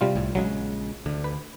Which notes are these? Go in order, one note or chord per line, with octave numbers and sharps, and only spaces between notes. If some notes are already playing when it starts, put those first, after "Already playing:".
C3 G3 F4
C2 A2
A#1 C#3 F#3 G#3
D2 D3
B4